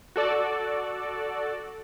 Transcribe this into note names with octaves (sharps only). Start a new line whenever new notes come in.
F#4 A4 D5